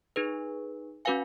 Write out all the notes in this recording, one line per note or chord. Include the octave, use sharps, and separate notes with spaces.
D#4 G#4 B4
C#4 F#4 B4 F5 G#5